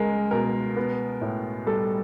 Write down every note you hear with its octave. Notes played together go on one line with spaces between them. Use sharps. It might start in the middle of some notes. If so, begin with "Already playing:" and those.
Already playing: C#2 G#3 A#4
B2 A#4
B3
A2
G3 A4